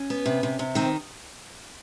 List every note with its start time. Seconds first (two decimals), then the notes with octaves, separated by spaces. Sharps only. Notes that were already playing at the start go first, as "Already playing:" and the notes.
Already playing: C#4
0.10 B3
0.26 C3
0.43 C3
0.59 C3
0.75 D#3 C4